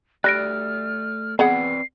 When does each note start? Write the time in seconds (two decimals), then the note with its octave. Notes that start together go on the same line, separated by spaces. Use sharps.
0.24 G3 A3 D5 F6 F#6 A#6 D7
1.39 B3 C4 G#4 B4 D5 F#5 C7